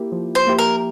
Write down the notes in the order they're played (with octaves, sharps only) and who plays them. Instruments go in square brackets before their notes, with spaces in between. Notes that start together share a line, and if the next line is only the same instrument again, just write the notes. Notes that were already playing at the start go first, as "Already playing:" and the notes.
Already playing: [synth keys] A#3 E4 G4
F3
[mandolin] C5
[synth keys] A#3 E4 G4
[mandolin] A#4